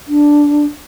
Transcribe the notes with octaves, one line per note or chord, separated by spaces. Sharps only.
D4